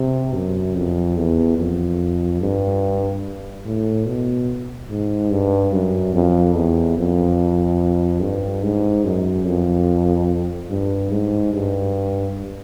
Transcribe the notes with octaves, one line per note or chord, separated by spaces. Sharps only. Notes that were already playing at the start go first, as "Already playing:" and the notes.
Already playing: C3
F#2
F2
E2
F2
G2
A2
B2
G#2
G2
F#2
F2
E2
F2
G2
G#2
F#2
F2
G2
G#2
G2